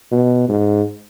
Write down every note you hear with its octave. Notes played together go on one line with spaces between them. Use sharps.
B2
G#2